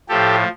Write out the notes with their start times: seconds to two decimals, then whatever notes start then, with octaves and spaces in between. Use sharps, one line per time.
0.09 A2 F3 G4 A4